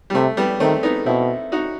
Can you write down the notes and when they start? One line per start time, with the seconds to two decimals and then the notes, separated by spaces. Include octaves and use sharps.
0.10 G3
0.14 C3 A3
0.37 G3 B3
0.60 D#3 A3 C4
0.83 B3 D#4
1.05 B2 C4 E4
1.52 D#4 F#4